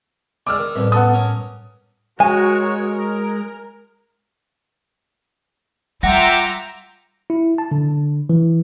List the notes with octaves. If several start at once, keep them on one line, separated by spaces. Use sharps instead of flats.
G3 G#3 D5 D6 E6 F6
D#3
C2 F2 A2 G3 B4
B3 A4 F#5 A5 D#6
C#4 A#4
G#3 F#4 A#4 C#5 G#5
A#4
G3 F4 E5 F#5 G5 A#5 D6 A#6
E4
A5
D3
D3
E3